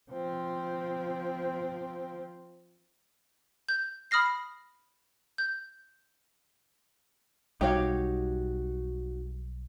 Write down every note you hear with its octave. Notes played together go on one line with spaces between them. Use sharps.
F3 C4
G6
B5 D#6 F6 A#6 C7
G6
B1 G3 D#4 F#4 G4 C#5 F5